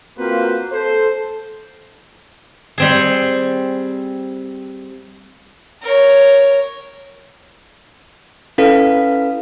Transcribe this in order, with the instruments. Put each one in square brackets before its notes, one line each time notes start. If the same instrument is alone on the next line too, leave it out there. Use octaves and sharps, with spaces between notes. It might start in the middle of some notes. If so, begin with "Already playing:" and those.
[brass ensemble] A#3 C4 F4 F#4 B4 C5
A4 C5
[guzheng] G3 C4 G#4
[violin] A#4 C#5
[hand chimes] C#4 E4 A4 B4 F5 B6